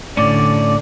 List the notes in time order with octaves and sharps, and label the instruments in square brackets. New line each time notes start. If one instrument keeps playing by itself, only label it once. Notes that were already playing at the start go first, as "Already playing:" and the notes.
[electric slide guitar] A2 C#4 [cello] D3 [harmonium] D5